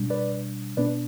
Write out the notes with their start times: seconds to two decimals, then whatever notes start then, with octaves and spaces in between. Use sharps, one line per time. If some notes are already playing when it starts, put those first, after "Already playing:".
Already playing: B2 G3 D4
0.10 B4 D5
0.77 B2 B3 D4 B4 D5